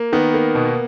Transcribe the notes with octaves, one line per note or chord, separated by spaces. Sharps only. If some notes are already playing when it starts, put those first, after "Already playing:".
Already playing: A#3
D#3 B3
A#3
B2